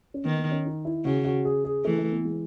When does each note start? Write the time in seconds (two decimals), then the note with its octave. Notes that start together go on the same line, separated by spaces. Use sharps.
0.14 C#4
0.25 D#3 B3
0.38 B3
0.51 C#4
0.65 D#4
0.85 E4
1.05 C#3 F#4
1.25 F#4
1.45 G#4
1.64 G#4
1.85 E3 A3
1.98 A3
2.12 B3
2.25 G#3